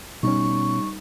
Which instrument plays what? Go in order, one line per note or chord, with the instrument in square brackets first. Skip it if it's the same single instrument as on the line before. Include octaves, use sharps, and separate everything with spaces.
[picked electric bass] B2 C#4 [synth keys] G3 D#4 [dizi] C#6